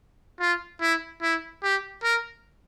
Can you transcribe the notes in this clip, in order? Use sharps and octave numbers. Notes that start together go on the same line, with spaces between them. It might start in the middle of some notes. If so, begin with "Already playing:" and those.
F4
E4
E4
G4
A#4